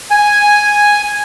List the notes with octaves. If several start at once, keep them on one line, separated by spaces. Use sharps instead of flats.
G#5